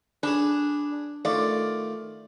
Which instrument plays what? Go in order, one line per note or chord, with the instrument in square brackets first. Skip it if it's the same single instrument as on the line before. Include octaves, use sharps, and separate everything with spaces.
[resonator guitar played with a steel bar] D4 [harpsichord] G#4 B4
[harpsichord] D#3 A3 F4 [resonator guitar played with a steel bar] D5